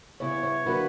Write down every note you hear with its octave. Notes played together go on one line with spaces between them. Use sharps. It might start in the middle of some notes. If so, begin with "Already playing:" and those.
C#3 G3 B3 E4 C#5
C#5
D3 F#3 A#3 D4 F#4 B4